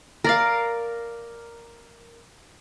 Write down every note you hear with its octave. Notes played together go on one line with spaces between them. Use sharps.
A#4 D5 F5